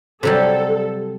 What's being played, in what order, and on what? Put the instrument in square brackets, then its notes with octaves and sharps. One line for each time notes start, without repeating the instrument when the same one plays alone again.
[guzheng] C3 F#3 G3 [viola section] A4